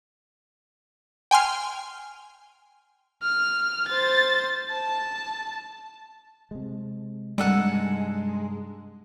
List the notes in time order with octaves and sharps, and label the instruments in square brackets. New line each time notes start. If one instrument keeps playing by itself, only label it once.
[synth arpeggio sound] G5 G#5 C6 F6
[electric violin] F6
C5 A6
A5
[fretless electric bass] C3 G#3
[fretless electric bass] G2 C3 [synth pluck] G3 [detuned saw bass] G#3 [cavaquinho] D#4 A4 F#5